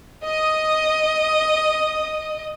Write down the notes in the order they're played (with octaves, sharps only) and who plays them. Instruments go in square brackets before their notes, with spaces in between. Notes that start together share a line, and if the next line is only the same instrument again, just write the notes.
[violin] D#5 D#6